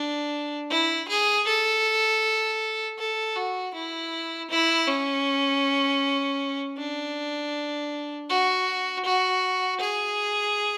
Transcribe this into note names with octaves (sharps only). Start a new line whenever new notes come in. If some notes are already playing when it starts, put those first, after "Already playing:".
Already playing: D4
E4
G#4
A4
A4
F#4
E4
E4
C#4
D4
F#4
F#4
G#4